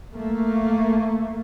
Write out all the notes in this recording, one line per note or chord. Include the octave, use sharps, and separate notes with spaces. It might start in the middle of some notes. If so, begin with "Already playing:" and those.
A3 A#3